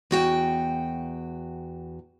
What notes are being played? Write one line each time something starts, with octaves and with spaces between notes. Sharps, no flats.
E2 F#4 G5